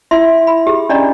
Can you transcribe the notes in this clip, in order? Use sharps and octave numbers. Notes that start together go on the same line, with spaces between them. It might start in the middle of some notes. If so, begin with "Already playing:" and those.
E4 E5 C6
B5
G4 G#4
C#4 D4 D5 D#5 A#5